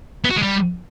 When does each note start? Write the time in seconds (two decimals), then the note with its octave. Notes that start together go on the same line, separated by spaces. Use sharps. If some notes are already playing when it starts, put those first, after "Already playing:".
0.24 B3
0.30 F#4
0.36 G#3
0.42 G3